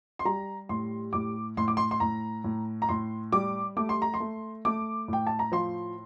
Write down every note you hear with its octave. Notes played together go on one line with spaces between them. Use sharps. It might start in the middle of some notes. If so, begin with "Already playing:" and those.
C6
G3 A#5
A2 C6
A2 D6
A2 C6
D6
C6
C6
A2 A#5
A2
A#5
A2 C6
G3 D6
A3 D6
C6
A#5
C6
A3
A3 D6
A2 G5
A5
A#5
F3 C6